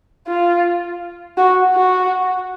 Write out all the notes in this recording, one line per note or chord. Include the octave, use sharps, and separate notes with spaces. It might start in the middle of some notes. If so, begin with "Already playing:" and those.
F4
F#4
F#4